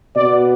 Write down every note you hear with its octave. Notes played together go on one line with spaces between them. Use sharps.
B2 B3 D5